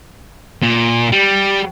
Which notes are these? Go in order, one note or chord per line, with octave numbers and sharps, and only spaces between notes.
A#2
G3